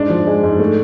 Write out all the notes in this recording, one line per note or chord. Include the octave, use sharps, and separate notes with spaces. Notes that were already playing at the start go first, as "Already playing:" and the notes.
Already playing: G#2 D4
F3
G#3
G#2
A3